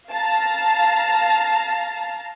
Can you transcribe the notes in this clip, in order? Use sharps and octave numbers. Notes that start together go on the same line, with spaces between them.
F5 A5 A#5